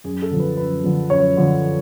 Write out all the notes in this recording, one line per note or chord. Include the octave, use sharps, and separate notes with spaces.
F#2 G#4
A4
D3 F3
B4
F#2 B4
D3 F3
F#2 C#5
D3 F3